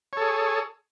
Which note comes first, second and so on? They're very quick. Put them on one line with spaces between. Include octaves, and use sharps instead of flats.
C#5 A4 G#4